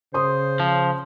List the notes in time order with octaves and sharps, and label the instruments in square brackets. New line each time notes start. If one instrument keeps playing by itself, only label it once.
[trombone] C#3 [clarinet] C5 [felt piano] C6 D#6
[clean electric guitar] F3